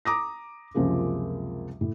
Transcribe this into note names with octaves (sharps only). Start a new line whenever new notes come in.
A#5 D6 D#6 A#6
C#2 F#2 C3 F3 G#3 A#3
A2